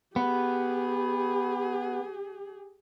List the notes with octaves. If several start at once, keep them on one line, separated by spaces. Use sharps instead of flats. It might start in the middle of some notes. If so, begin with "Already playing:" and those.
B3 G4 G#4